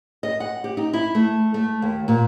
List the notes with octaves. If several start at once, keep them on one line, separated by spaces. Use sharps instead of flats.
D#5
F#5
G4
D#4
E4
A3
A3
D#2
A#2